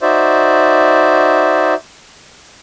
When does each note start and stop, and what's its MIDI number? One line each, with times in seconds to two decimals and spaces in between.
0.02 1.74 63
0.02 1.74 66
0.02 1.74 72
0.02 1.74 74
0.02 1.74 76